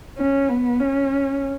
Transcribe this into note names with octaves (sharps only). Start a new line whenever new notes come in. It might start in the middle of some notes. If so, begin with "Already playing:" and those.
C#4
B3
C#4